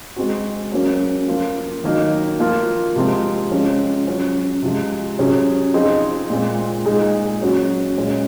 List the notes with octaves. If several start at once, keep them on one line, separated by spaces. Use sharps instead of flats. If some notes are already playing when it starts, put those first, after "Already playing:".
G#3 C4 F#4
F#3 A#3 C#4
F3 A#3 F4
D#3 F#3 A#3 D#4
F3 A#3 F4
C3 F3 G#3 C4
F3 G#3 C#4
F#3 C#4 F#4
C3 F3 G#3
C3 F#3 C#4 G#4
F3 C4 D#4 G#4
A#2 G#3 C4
A#2 G#3 D#4 G#4
F#3 C#4 F#4
A#2 G#3 C#4